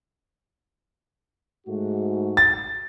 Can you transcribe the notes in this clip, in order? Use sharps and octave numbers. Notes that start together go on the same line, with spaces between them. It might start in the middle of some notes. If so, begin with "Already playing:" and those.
G#2 A3 F#4
A6